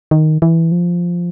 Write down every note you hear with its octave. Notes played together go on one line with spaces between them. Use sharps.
D#3
E3
F3